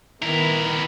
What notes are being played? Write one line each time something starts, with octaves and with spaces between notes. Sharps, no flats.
D#3 B3 E4 A#4